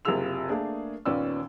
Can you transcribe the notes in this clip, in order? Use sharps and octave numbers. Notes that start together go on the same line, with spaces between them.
F#1 C3 F4 G#4 E6 F7
A3 A#3 D4 G#4
D#2 A#2 B3 C#4 D5 E6